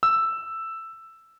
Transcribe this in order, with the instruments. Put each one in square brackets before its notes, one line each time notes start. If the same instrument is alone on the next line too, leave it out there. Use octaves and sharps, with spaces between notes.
[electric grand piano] E6